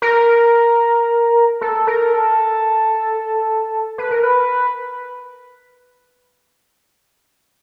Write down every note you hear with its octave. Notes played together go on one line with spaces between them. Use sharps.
A#4
A4
A#4
A4
B4
A#4
B4